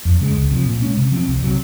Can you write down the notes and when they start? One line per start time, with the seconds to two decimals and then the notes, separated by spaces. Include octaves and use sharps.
0.05 F2
0.21 C#3 G#3
0.37 C#2
0.51 C3 F3
0.66 A#2
0.82 G#3 C#4
0.97 C3
1.12 F3 C4
1.28 C2
1.42 C3 F#3